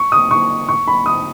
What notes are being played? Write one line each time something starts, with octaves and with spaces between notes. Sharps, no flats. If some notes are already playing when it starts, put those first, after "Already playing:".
Already playing: C#6
D#6
C#6
C#6
B5
D#6